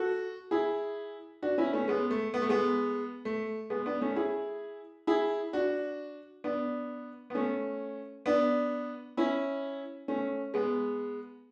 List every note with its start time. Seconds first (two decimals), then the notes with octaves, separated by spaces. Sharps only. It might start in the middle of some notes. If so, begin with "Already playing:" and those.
Already playing: F#4 A4
0.51 E4 G#4
1.43 D4 F#4
1.58 C#4 E4
1.73 A3 C#4
1.88 G#3 B3
2.11 A3
2.34 B3
2.42 A3
2.49 G#3 B3
3.25 A3
3.70 G#3 B3
3.86 B3 D4
4.01 A3 C#4
4.16 E4 G#4
5.07 E4 G#4
5.53 D4 F#4
6.44 B3 D4
7.30 B3
7.35 A3 C#4
8.26 B3 D4
9.17 C#4 E4
10.08 A3 C#4
10.54 G#3 B3